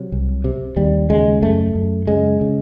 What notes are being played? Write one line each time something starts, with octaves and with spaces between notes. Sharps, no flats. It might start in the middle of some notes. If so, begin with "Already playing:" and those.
Already playing: C3 F#3
C2
C3
D#2 G3
C#3 G#3
F#2 A3
F#2
C#3 G#3
C#3